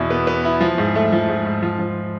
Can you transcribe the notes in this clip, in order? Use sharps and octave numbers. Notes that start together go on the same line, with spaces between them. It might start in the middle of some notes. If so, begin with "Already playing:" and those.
Already playing: E2 B2 E4
B3
B3
E4
F3
G#2
A3
F3
G#2
G#2
F3
F3